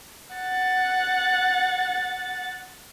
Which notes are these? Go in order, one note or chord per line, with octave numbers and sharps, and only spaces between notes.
F#5 A6